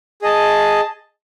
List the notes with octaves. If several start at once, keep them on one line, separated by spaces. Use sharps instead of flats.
G#4 D#5 A5